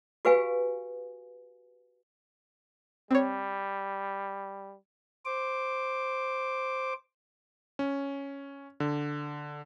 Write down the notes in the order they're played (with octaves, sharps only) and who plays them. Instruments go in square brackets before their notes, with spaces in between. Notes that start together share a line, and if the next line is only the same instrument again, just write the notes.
[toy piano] F#4 G4 B4 F5 G#5
[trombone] G3 [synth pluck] C4 C#5
[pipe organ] C5 D6
[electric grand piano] C#4
D3